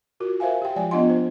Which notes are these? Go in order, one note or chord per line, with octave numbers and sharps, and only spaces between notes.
F4 F#4 A#4
A#4 C5 E5 F5 G#5
G4 G5
F3 G#3 F4 D5 G5 G#5
B3 D4 F4 D#5 F#5 C6
C5